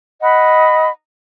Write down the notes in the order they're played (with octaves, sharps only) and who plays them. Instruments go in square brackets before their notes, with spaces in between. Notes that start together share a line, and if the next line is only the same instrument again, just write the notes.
[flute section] D#5 F#5 B5